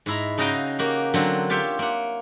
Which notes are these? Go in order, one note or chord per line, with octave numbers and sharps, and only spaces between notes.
G#2 E4 A#5
C#3 D#4 F#4 D#5 F5 G5
A#3 F#4 G4
D3 F#3 C4
F4 G4 C#5 E5 G5
A#3 F#5